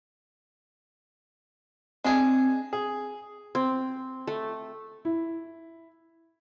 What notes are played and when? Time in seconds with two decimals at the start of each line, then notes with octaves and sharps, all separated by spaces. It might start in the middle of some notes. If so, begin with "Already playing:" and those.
2.04 G#3 C4 D4 G#4
2.73 G#4
3.55 C4
4.27 A3
5.05 E4